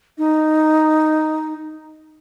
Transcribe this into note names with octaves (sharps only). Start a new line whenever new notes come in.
D#4